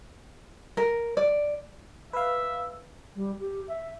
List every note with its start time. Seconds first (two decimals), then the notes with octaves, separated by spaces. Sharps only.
0.77 A#4
1.17 D5
2.13 B4 E5 F5
3.15 G3
3.39 G4
3.67 E5